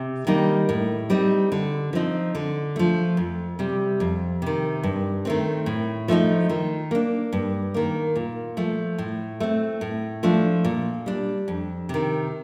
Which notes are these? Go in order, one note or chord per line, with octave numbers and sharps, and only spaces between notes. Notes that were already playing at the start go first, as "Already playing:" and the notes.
Already playing: C3
D#3 G3 A#3 D#4
A2
G3 C4 D#4
D3
F3 C4 D#4
D3
F3 A3
F2
C3 G3
F2
C3 D#3
G2
D#3 A3 C4
A2
F3 A3 C4 D#4
D#3
A#3 D4
G2
D#3 A#3
A#2
F3 A3
A2
A3 C4
A2
F3 A3 D4
A#2
G3 D4
F2
C3 D#3